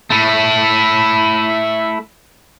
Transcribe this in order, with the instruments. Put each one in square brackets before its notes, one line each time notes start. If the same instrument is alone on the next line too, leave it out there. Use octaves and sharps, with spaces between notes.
[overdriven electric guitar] A3 E4